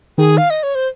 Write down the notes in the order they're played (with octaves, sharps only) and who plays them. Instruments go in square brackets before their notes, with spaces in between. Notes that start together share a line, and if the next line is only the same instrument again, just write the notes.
[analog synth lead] D#3 [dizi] G#4
[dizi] F5
D#5
C#5
C5